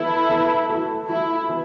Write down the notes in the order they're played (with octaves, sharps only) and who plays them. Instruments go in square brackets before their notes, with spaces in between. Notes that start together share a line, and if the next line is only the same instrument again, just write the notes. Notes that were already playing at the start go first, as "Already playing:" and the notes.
Already playing: [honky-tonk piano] E3 B3 A4 [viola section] E4
[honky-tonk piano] E3 B3 A4
E3 A3 F#4 A4
[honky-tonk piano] E3 A3 F#4 A4 [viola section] E4
[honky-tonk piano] E3 B3